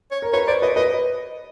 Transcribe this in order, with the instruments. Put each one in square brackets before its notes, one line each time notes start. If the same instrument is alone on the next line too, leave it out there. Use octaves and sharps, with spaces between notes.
[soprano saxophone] C#5
[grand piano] A#4
[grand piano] B4 [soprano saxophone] C#5
[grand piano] C5 [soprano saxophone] D5
[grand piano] B4 [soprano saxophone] D#5
[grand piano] B4 [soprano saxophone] D#5